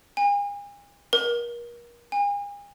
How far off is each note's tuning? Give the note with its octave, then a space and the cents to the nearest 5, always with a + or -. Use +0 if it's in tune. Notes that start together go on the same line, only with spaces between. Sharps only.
G#5 -40
A#4 +35
G#5 -40